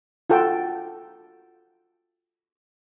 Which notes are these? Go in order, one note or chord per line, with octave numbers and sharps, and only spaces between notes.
F4 F#4 A4 G5